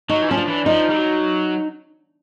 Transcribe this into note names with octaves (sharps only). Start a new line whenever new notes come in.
F#3 D#4
E3
F3 C#4
D4
E3
F3 D#4
G3
F#3